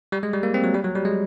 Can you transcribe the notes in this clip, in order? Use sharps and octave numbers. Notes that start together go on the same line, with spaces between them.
G3
G#3
G3
A#3
C4
F#3
G3
F#3
G3
G#3